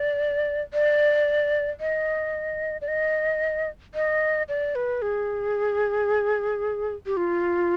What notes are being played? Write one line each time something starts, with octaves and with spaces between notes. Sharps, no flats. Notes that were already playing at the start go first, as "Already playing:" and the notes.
Already playing: D5
D5
D#5
D5
D#5
D#5
D5
B4
G#4
G4
F4